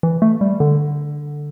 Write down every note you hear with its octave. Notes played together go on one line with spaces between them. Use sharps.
E3
A3
G3
D3